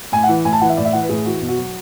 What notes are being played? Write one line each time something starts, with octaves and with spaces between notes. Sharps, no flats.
A2 G#5
F#5
E3
A2 G#5
A5
E3 F#5
E5
A2 D5
E5
E3 F#5
B4
A2 G#4
E3 F#4
B2
F#4
F#3